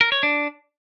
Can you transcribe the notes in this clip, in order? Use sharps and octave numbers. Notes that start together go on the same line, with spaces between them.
A#4
C#5
D4